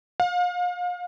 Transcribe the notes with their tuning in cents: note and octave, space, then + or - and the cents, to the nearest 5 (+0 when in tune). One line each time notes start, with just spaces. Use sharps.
F5 +35